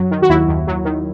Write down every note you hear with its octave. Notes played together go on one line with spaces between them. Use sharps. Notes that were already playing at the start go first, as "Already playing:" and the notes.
Already playing: F#2 F#3
D#3
F#4
D#2 E4
D#2
F#3
D#3